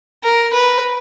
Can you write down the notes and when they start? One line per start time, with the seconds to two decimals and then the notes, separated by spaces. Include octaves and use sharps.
0.23 A#4
0.53 B4